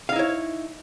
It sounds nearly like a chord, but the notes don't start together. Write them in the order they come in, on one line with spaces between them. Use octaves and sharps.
F5 D#4 E4 C#5